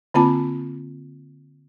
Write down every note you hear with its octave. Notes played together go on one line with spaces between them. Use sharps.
D3 A#3 C4 F4 A5 B5